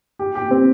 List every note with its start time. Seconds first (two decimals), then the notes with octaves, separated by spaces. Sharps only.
0.19 G4
0.35 G4
0.51 C4